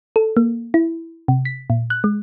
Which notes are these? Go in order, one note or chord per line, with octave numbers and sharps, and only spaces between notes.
A4
A#3
E4
C3
B6
A#2
F#6
G#3